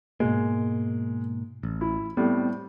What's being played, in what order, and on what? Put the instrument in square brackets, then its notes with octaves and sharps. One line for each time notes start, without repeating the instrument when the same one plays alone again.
[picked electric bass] G#2 B2 A#3 [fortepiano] G#3
[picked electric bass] A1
[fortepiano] E4
[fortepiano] A2 G3 [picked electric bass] B3 C4